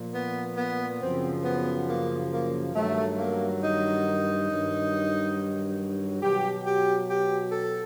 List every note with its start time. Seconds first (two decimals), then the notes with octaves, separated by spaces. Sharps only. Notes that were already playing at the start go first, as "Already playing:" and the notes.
Already playing: A#2 F3
0.14 B3
0.57 B3
1.00 F#2 C#3 F3 C4
1.45 B3
1.88 A#3
2.31 A#3
2.74 G2 D#3 F#3 A3
3.17 A#3
3.61 D#4
4.48 G2 D#3 F#3
6.20 B2 F#3 G4
6.65 G4
7.08 G4
7.52 A4